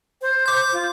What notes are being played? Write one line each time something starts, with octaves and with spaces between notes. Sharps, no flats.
C5
D6 G6
F4